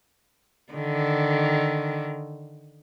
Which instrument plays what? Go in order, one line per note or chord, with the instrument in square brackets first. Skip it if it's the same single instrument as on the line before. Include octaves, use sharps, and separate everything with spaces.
[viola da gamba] D3 D#3